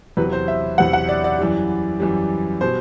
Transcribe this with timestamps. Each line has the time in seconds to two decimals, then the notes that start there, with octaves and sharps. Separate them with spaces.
0.17 E2 C3 F#3 B4
0.33 C5
0.48 E5
0.78 E2 C3 F#3 F#5
0.93 F#5
1.09 D5
1.24 D5
1.39 F#2 E3 G3
2.00 F#2 E3 G3
2.61 B2 G3 C5